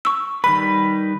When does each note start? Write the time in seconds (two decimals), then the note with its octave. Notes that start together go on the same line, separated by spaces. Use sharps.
0.05 C#6 E6
0.44 D#3 G3 B4 B5